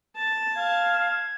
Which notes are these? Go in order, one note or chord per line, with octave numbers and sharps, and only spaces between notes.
A5 A6
F5 G#6